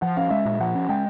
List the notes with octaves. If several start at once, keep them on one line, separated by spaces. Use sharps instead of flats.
F3 F#5
C#4 F5
G#3 E5
A#2
F3 F#5
C#4
G#3 G5